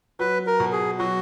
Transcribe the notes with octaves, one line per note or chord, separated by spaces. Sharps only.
F#3 B4
A#4
B2
G#4
F#3 F#4